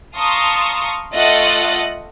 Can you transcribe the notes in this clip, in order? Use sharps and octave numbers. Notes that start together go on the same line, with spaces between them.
F5 A5 A#5 C6 C#6 D#6
A3 F4 D#5 F#5 F#6 A6